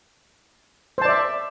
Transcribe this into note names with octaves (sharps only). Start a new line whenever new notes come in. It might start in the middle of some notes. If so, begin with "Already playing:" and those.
C5 D5 E5 A5